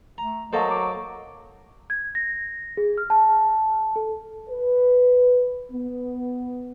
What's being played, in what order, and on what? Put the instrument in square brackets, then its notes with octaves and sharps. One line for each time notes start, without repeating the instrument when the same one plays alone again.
[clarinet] A3 [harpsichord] A#5
[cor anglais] F#3 [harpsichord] A#3 A4 C5 [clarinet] D#5
[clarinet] D6
[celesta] G#6
A#6
G#4
F6
A5
A4
[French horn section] B4
B3